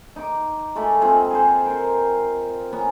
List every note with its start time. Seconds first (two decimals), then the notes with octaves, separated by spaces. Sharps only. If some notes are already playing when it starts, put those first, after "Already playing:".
0.16 D#4 D6
0.75 G#3 A3 B4
1.01 G#3 C4 F4
1.31 G#4 A4 C5
1.66 A#4 C5
2.73 B3 C#4 A#5